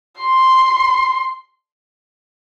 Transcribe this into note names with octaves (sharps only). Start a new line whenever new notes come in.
C6